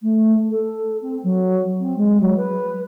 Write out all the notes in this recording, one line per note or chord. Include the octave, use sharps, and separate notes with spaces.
A3
A4
C4
F#3
C4
G#3
F#3
B4